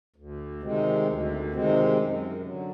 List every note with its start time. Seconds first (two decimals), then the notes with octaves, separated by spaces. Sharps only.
0.16 D2
0.62 C3 D#3 G#3 C4
1.07 D2
1.52 C3 D#3 G#3 C4
1.98 F#2
2.43 D3 F#3